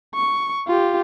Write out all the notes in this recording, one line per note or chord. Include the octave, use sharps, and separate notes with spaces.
C#6
F4 G4